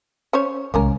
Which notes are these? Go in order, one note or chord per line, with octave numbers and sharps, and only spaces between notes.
C#4 C5 C#5
C2 G#3 A#3 C#4 A#4